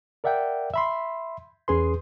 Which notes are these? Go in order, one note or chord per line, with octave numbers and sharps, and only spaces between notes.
A#4 D5 E5 F#5 G5
E5 B5 C6
E2 C#4 G#4 B4 C6